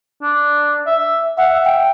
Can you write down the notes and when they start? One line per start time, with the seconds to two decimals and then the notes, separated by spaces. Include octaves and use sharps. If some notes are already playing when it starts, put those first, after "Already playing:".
0.23 D4
0.87 E5
1.38 E5 F#5
1.65 G5